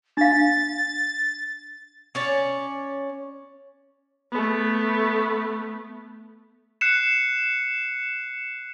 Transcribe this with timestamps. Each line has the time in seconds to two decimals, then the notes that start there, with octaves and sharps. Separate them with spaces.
0.17 D4 F5 A6
2.15 C#4 C#5 D5
4.32 A3 B3
6.81 F#6 C7 C#7 E7